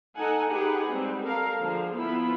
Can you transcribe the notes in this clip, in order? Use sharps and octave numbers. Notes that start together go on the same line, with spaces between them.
D#4 A4 F#5 G#5
D#4 G4 G#4 B4 F#5 G#5
G3 G#3 C4
A4 A#4 F5
D3 F3 G#4 C5
F3 B3 E4 F4 B5